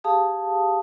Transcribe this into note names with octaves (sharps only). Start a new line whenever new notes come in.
G4 G#4 F5 A5 D#6